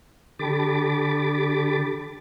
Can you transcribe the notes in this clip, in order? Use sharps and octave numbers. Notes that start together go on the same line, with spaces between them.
D3 G4 A4 B5 D6 A6